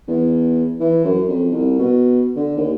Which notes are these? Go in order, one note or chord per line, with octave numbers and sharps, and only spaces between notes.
E2
E3
F#2
F2
C2
B2
D3
D#2